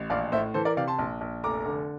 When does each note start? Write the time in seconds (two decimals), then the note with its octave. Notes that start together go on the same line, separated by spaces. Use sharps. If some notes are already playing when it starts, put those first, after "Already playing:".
Already playing: A1
0.10 A#1 D5 F5
0.32 A2 C5 E5
0.54 E3 A4 C5
0.65 A#4 D5
0.77 C3 D5 F5
0.88 A5 C6
0.99 A#1
1.21 A#1
1.44 F1 A#5 D6
1.66 D3